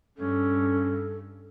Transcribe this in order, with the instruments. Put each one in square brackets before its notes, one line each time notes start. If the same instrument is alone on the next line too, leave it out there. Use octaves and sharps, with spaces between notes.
[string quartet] G2 [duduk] C#4 [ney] A4